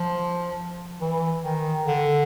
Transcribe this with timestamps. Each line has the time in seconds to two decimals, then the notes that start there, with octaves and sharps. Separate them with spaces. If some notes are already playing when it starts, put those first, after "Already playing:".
Already playing: F3
1.01 E3
1.44 D#3
1.87 D3